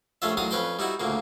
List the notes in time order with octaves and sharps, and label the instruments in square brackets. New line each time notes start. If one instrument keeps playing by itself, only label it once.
[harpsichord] A#1 A3 C#4 F4 E5
A1 D#3 F#3 F5 D#6
F2 C#4 B4 G5 C6
G3 D#4 E4 F#4
D2 A#2 C#3 A#3